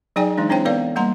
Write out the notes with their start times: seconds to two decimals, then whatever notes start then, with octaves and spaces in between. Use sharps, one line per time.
0.16 F#3 D#4 G#4 D5 G5 G#5
0.37 E3 G#3 D4 D#4
0.49 C4 D4 E4 C5 C#5 G5
0.65 B3 A4 B4 D5 F5
0.96 G3 A#3 F#5 A#5 C6